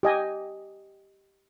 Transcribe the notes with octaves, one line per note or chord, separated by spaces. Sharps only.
G4 D#5 G#5